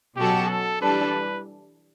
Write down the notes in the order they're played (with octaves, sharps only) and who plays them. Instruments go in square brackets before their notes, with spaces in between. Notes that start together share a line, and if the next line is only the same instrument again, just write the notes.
[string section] B2 F#3 C#4 F#4 A4 [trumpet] G4
[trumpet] A4
[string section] E3 G3 D4 A4 [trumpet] B4